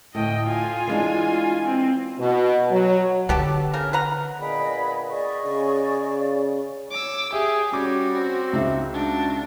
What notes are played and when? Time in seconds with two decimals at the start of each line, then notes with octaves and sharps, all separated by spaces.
0.15 D2 A2 D#5 G5
0.48 F4 G#5
0.87 E3 G#3 D4
1.66 C4
2.19 B2
2.70 F#3
3.29 D3 B3 G4 A4
3.73 C#3 A#4
3.93 B4 F#5 A#5
4.39 A#2 B3 D4 G#4 D#5 G5 B5
5.09 G#4 D5 D#5 C#6
5.43 C#3 D5
6.91 C#5 D6 E6
7.33 G4 G#4 E5
7.73 G3 C#4 F#4 D6
8.15 C4
8.53 C#2 D#4 E5
8.93 D4 F#4